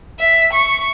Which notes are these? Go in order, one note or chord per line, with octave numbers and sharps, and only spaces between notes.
E5
C#6